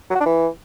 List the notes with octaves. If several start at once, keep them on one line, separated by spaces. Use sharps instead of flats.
F#3
F#4
D4
E3